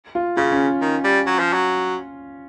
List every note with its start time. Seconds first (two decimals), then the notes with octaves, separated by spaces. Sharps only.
0.15 F4
0.37 C#3 F4
0.52 C#4
0.81 D#3
1.04 G3
1.26 F#3
1.39 F3
1.53 F#3